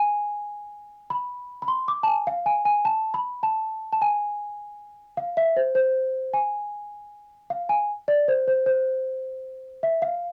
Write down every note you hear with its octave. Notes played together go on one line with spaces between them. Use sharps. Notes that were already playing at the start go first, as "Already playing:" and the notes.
Already playing: G#5
B5
B5
C6
D6
A5
G#5
F5
G#5
G#5
A5
B5
A5
A5
G#5
F5
E5
C5
C5
G#5
F5
G#5
D5
C5
C5
C5
E5
F5